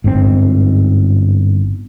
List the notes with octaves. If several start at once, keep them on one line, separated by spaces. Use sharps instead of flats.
G1 G#2 B2 C4